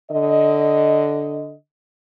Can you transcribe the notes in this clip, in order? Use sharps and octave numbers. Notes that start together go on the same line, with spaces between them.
D3 D#5